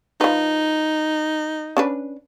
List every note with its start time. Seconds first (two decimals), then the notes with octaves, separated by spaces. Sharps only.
0.21 F3 D#4 B4
1.77 C#4 D4 B4